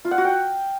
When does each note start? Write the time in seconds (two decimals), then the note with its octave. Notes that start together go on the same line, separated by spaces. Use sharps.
0.05 F4
0.11 F#5
0.18 F#4
0.24 G5